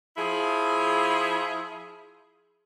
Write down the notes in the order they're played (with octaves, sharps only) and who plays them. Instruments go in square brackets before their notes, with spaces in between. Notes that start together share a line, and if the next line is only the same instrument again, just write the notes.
[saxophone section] F3 E4 G#4